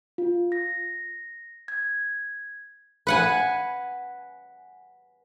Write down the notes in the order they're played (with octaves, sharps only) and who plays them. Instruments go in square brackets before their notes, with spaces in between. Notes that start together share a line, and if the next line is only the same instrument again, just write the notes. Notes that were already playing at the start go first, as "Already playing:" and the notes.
[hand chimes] F4
A#6
G#6
[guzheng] B4 F#5 G#5